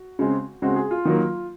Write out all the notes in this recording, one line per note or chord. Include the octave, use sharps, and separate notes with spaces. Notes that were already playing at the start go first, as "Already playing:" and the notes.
Already playing: F#4
C#3 G#3 C4
C#3 G#3 C4 F#4
G#4
F4
D#3 F#3 A#3